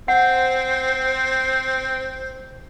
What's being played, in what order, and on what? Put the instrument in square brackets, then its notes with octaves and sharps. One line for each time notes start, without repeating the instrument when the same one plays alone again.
[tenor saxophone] C4 [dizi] C5 [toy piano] F#5